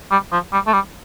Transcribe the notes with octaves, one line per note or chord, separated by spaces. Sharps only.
G3
F3
G3
A3
G3